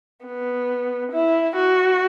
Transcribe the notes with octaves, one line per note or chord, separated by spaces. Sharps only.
B3
E4
F#4